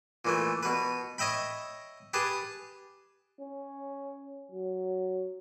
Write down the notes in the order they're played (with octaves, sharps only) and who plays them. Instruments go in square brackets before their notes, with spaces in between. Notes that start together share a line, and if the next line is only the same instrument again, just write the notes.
[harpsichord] A#2 E3 A3
B2 B4
C#5 D#5 E5 G5 B5
G4 G#4 B4 A5
[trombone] C#4
F#3